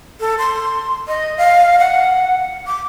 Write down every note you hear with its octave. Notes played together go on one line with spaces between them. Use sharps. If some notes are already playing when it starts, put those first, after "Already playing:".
A4
C6
D#5
F5
F#5
D6